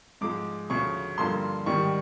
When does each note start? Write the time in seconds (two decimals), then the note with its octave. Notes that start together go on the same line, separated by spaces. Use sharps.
0.21 G#2 F3 G#3 D6
0.70 D2 C#3 F3 C#6
1.18 G2 D3 F3 A#3 C6
1.66 G#2 D#3 G3 C#6